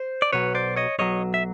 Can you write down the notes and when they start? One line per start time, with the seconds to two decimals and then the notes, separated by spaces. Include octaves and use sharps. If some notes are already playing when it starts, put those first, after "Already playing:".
Already playing: C5
0.22 D5
0.33 B1 B2 F#3 B4 C#5
0.55 C5 D5
0.76 C#5 D#5
0.99 B1 B2 F#3 C#5 D#5
1.34 E5